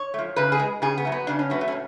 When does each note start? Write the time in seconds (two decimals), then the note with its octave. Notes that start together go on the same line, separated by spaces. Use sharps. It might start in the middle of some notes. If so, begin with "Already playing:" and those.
Already playing: C#5
0.14 F3 A3
0.36 C#3 B4
0.52 G#4
0.60 G#3
0.82 C#3 G#4
0.98 B3
1.05 F#3 A3
1.12 B3
1.27 C#3 D4
1.39 C#4
1.50 F#3 A3 B3
1.61 A3
1.68 C#4
1.72 A2